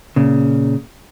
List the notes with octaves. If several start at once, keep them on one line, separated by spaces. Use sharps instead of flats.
A#2 C#3